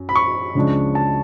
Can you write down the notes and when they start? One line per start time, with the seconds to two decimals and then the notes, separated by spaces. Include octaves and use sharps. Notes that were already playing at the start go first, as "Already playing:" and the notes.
Already playing: F#2
0.09 B5
0.16 C#6
0.55 C#2 C#3 F3 G#3 D4
0.95 A5